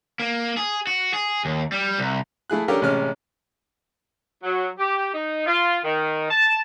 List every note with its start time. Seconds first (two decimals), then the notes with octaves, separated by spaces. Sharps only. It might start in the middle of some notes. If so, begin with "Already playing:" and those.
0.20 A#3
0.57 G#4
0.87 F#4
1.13 G#4
1.45 D#2
1.72 G3
1.98 C2
2.50 A3 E4 G#4 F#6
2.68 C#4 D4 G4 A4 A#4
2.81 A1 C3 G#3 C#4 F6
4.43 F#3
4.78 G4
5.14 D#4
5.46 F4
5.84 D#3
6.30 A5